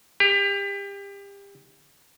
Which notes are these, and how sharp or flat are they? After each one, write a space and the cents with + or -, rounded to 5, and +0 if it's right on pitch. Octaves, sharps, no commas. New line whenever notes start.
G4 +30